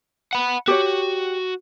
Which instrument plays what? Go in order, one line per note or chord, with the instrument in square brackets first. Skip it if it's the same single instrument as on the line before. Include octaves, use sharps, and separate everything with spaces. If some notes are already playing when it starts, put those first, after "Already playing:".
[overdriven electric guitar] F#5 B5
[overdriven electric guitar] F#4 [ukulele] G4 C#5